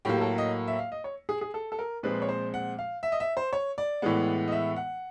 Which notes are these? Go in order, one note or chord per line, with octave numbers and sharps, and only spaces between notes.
A2 F#3 A#3 G4
A4
D#5
E5
F5
D#5
C#5
G#4
G#4
A4
A4
A#4
A#2 F3 G#3 C4 B4
C#5
C5
F#5
F5
E5
D#5
E5
C5
C#5
D5
A2 E3 G#3 B3
D#5
E5
F#5